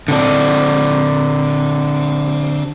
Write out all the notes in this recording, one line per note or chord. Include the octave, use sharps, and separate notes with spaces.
D3 C4 D4